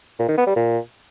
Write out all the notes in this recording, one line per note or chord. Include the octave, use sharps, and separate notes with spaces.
A#2
D#3
B3
G3
A#2